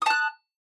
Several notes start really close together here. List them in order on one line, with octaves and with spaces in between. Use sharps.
D#6 A5 F#6